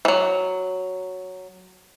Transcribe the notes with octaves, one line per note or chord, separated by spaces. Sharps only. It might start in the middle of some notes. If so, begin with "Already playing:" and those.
E3 F#3